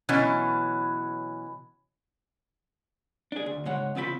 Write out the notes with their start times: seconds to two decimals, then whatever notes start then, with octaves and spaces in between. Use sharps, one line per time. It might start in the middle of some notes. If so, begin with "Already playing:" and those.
0.09 B2 E3 F#3 C#4
3.32 D4 G#4
3.46 D2
3.65 G#2 C#3 G#3 C#5 F#5
3.95 E2 C#3 C4 F4 A#4 B5